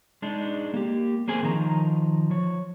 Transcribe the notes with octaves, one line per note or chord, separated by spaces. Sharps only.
G#3 D4 D#4
A#3 G4
A#3 C4 G#4 G#5
D#3 F3 D#4 A#5
F3 C#5